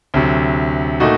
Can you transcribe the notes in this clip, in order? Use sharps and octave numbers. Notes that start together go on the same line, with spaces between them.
D2 C3 F#3
A#2 A3 D#4 F#4